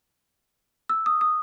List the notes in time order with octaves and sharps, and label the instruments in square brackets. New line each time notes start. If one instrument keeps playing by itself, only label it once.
[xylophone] E6
D#6
D#6